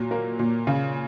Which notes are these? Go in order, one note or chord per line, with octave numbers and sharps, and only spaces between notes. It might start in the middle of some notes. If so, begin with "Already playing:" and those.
Already playing: A#2 F#3
A#3
A#2
C#3